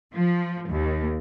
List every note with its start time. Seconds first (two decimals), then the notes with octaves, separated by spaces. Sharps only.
0.15 F3
0.70 D#2